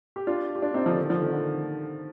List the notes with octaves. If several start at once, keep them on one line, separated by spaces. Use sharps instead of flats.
G4
D4 F4
G4
D4 F4
C4 D#4
D3 F3
D#3
D3 F3
D#3
D3